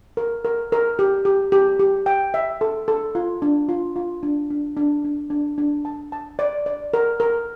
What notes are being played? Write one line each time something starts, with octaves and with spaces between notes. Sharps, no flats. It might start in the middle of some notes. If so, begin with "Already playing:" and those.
A#4
A#4
A#4
G4
G4
G4
G4
G5
E5
A4
A4
F4
D4
F4
F4
D4
D4
D4
D4
D4
D4
A5
A5
D5
D5
A#4
A#4